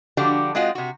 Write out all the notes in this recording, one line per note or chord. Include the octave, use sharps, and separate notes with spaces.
D3 F3 G3 D4 F#4 G4
G#3 C4 F4 F#4 D#5
C3 F#4